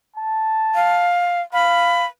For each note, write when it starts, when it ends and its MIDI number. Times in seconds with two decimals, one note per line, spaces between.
0.15 1.11 81
0.75 1.41 77
1.53 2.05 77
1.53 2.06 83